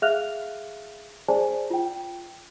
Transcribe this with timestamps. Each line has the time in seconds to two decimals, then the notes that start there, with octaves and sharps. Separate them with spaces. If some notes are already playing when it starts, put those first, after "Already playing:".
0.02 G#4 E5 F5 F6 F#6 F7
1.28 G#4 C5 D5 G#5 A5
1.70 F4 G5